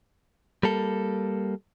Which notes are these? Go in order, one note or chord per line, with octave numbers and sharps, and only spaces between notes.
G3 A#3 A4